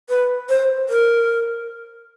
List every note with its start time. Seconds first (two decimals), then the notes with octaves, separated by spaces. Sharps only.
0.09 B4
0.49 C5
0.89 A#4